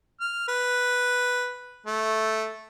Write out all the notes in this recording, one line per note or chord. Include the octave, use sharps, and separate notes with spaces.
F6
B4
A3